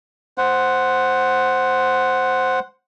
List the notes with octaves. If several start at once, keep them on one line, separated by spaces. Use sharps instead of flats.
C5 F#5